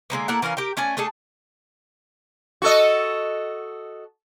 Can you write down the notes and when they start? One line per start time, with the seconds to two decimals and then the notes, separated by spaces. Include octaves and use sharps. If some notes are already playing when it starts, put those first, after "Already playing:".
0.10 D3 G#3 A#3 B3
0.28 A#3 E4 A4 F#5
0.42 E3 C#4 A#4 F5
0.57 G4 A#4 G5
0.77 A3 C#4 D5 G#5
0.97 A3 D4 G#4 A4
2.62 F#4 A4 D#5